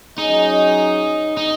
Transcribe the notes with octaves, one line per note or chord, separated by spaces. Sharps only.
F#3 C#4 D#4 G#4 D#5
D#4